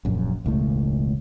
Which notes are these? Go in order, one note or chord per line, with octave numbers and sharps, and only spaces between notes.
D#1 A#1 F#2
E1 C#2 A2 A3